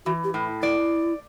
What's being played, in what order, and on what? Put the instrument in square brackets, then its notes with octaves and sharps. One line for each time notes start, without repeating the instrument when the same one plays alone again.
[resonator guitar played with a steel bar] E3 [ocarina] F#4
[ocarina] G4
[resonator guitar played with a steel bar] A2
[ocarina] E4 [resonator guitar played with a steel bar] D5